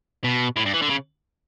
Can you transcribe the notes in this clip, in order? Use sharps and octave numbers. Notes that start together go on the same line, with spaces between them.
B2
A2
G2
E3
D3
C#3